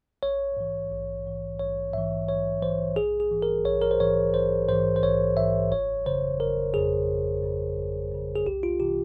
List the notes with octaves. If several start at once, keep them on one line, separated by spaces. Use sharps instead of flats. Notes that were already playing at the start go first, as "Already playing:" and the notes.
A#1 C#5
G#2 E3
A#1
G#2 E3
A#1 C#5
G#2 E3 E5
A#1 C#5
G#2 E3 C5
A#1 G#4
G#4
G#2 E3
A#4
A#1 C#5
A#4
C5
G#2 E3 C#5
A#1 C5
G#2 E3 C5
C5
A#1 C#5
G#2 E3 E5
G1 C#5
F2 C#3 C5
G1 A#4
F2 C#3 G#4
G1
F2 C#3
G1
F2 C#3
G#4
C2 G4
F4
C3 E3 G4